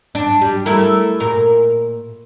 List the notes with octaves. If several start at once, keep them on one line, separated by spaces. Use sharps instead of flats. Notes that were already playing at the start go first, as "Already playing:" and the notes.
D4
G3
A3 E4 A#4
A#2 A#4